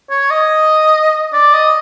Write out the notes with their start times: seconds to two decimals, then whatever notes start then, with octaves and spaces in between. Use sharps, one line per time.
0.10 C#5
0.31 D#5
1.33 D5
1.53 D#5